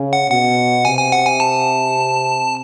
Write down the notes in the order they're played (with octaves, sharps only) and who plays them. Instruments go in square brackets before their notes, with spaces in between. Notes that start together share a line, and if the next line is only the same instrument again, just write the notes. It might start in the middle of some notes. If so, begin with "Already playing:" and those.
Already playing: [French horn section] C#3
[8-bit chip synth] F#5
[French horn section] B2 [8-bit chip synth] F#5
[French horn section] C3 [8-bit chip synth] G#5
[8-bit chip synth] G#5
F#5
G#5
A5